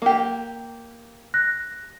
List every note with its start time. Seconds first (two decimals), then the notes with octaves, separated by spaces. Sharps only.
0.02 A#3 G4
1.34 F#6 A#6